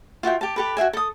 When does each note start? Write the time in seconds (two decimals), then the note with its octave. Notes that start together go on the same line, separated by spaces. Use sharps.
0.23 F4 F#4 E5 G5
0.41 G4 A5
0.56 G4 A4 B4
0.77 F#4 G#4 E5 G#5
0.93 A4 D#6